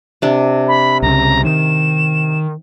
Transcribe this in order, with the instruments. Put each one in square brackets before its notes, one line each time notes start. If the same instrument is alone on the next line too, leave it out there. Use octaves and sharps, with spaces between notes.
[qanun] C3 D4
[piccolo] B5
[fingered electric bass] C2 C#3 [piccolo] A#5
[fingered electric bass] D#3 [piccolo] E7